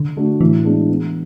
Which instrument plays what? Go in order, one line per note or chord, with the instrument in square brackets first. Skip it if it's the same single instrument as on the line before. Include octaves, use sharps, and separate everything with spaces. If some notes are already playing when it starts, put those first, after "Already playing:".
Already playing: [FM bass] D3
[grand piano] A3 D4 F#4
[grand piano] A2 [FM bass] E3
[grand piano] G#3 B3 D4
B3